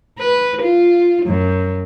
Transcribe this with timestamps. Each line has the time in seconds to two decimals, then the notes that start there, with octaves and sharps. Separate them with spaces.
0.18 B4
0.62 F4
1.26 F#2